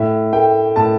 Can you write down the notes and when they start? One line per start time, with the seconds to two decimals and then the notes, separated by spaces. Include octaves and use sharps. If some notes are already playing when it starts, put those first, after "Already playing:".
Already playing: A2 E5
0.33 A3 G5
0.76 A2 A5